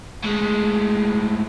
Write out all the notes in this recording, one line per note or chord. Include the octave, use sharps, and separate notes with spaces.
A2 G#3